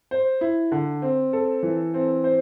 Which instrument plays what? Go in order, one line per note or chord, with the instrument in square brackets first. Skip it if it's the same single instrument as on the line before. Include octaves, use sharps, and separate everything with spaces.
[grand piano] C5
E4
D3
C4
A4
E3
C4
C5